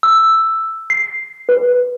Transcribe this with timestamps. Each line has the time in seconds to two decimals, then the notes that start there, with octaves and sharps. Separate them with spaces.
0.03 E6
0.90 C7
1.49 B4